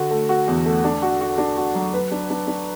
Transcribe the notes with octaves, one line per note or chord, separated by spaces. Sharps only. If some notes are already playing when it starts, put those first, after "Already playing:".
Already playing: D3 F#4
A3
F#4
E2
A3
D4
F#4
F#4
D4
F#4
F#3
B4
D4
D4
D4